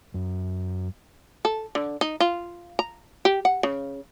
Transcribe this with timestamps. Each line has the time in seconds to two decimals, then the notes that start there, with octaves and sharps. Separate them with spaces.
0.14 F#2
1.45 A4
1.75 D3
2.01 D#4
2.20 F4
2.79 A#5
3.25 G4
3.45 F#5
3.63 C#3